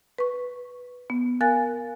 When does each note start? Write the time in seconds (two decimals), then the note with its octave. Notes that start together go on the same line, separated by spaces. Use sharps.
0.18 B4 C#6
1.10 B3
1.41 A#4 F5 G#5 F#6 A6